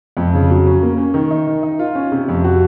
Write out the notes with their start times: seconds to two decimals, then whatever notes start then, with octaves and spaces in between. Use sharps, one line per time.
0.17 F2
0.33 C#3
0.50 F#3
0.66 C#4
0.83 A#3
0.98 C#4
1.14 D#3
1.31 D#4
1.47 D#3
1.63 D#4
1.79 F4
1.95 C#4
2.12 C3
2.28 F2
2.44 F#4